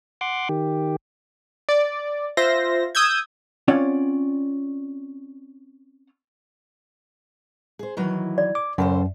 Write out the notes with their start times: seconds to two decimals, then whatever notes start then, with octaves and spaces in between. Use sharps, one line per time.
0.21 F#5 C6 D6
0.49 D#3 G4
1.69 D5
2.37 F4 C5 E5 A#6
2.95 D#6 E6 G6 G#6
3.68 C4 C#4 F4 C#5 D5 F#5
7.79 G#4 C5
7.97 D#3 E3 F#3
8.38 D5
8.55 D6
8.78 F#2 C#3 A4 C5